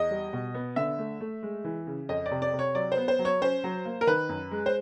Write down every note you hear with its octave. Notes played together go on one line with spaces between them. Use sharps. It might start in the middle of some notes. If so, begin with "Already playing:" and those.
Already playing: E2 D#5
G3
B2
B3
D3 E5
A3
A3
G#3
E3
C#3
F2 D#5
D5
C3
D5
C3
C#5
F#3 D5
C5
B3
C5
F#3
C#5
C#4 C5
F#3
A#3
A#4
D#3 B4
F#2
G#3
C5